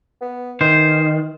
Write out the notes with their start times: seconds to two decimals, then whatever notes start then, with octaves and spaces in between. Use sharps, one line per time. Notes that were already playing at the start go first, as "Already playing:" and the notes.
0.21 B3
0.61 D#3 E3 C5